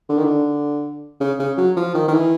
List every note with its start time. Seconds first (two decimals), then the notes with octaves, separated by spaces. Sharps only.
0.09 D3
0.18 D#3
0.24 D3
1.20 C#3
1.39 C#3
1.58 F#3
1.77 F3
1.95 D#3
2.08 D#3
2.13 E3